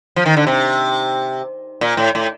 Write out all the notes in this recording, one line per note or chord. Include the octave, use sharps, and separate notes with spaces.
F3
D#3
D3
C3
A#2
A2
A2